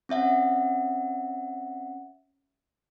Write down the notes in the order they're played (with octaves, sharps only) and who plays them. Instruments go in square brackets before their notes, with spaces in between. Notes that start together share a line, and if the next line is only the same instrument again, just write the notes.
[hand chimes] C4 C#4 E5 F#5